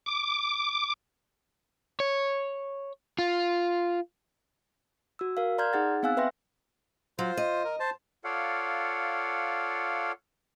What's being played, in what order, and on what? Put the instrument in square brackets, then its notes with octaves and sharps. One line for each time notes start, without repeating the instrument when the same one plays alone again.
[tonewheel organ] D6
[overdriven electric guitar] C#5
F4
[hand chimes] F#4 E6
A#4 F5
D5 A#5 C6 F6 G6 G#6
D#4 G#4 F#5 A6
B3 C4 F5 G#5 E6 F#6
B4 E5 G5 C6 A#6
[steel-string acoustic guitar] F#3 [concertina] F4 C5
[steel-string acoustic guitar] D#5
[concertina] A#4
C5 A5
[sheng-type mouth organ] F4 A4 C#5 D5 F5 F#5